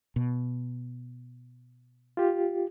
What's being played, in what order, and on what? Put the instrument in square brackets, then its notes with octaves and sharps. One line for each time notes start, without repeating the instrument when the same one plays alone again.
[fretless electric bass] B2
[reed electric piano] F4 G4